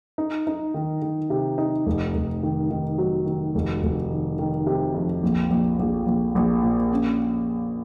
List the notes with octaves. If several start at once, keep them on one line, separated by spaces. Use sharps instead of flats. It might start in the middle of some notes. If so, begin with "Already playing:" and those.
D#4
D#4
D#3
D#3
C3
D#4
F1
F1
D#3
D#3
F#3
D#3
F1
F1
D#3
D#3
C3
F2
A#1
A#1
A#1
A#1
A#1
A#2
C#4